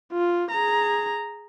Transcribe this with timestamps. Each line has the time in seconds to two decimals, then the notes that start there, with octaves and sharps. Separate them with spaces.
0.12 F4
0.51 G#4 A#5